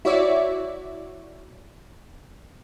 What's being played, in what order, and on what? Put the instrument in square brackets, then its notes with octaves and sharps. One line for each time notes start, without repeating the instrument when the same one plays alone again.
[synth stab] E4 F#4 C#5 D5 E5